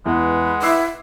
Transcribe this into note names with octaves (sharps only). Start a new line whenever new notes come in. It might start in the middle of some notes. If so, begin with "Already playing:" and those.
E2 G#3 B4 F#5
E4 D6 E6 C7